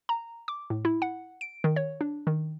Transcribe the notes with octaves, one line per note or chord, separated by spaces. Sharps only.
A#5
D6
A2
E4
F#5
D7
D#3
C#5
D4
D#3